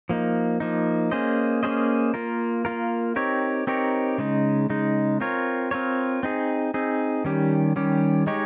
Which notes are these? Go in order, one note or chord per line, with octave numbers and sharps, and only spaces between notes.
F3 A#3 D#4
F3 A#3 D#4
A#3 C#4 G#4 C5 D#5
A#3 C#4 G#4 C5 D#5
A#3 F4 A#4
A#3 F4 A#4
C4 D#4 G4 A#4 C#5
C4 D#4 G4 A#4 C#5
C#3 G#3 D#4
C#3 G#3 D#4
C4 F4 A#4 C#5
C4 F4 A#4 C#5
C4 D#4 G#4
C4 D#4 G#4
D#3 G3 C#4 G4
D#3 G3 C#4 G4
G#3 D#4 G4 C#5